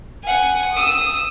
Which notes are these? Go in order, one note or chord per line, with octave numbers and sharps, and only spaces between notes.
F#5 G#5
D#6 E6